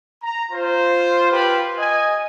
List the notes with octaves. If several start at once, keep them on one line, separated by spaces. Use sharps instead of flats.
A#5
F4 C5
F4 G4 B4 B5
D#5 G#5